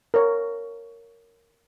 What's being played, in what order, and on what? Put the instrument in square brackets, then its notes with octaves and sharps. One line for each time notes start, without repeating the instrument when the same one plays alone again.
[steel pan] A#4 C#5